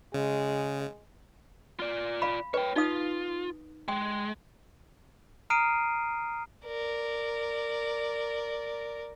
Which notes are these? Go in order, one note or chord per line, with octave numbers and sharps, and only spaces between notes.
C#3 G#3
F4 D5
F5 B5
B4 C#5 G5
D#4 F4 F5 D#6
G#3 G5
A#5 D#6 F6 C7 D7 D#7
A#4 D5